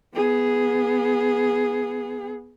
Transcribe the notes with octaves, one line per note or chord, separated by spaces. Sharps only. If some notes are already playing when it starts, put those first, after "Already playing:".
B3 G#4